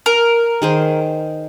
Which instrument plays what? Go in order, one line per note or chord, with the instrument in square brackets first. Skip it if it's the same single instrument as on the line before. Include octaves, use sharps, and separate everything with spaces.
[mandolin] A#4
[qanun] D#3 G#4 C5